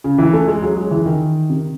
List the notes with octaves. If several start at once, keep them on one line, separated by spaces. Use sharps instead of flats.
C#3
E3
A3
G#3
F#3
G#3
E3
D#3
C3